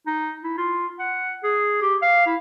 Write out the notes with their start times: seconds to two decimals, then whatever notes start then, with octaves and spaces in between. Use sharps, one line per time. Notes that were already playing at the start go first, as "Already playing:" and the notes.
0.07 D#4
0.43 E4
0.58 F4
0.99 F#5
1.43 G#4
1.81 G4
2.02 F5
2.26 E4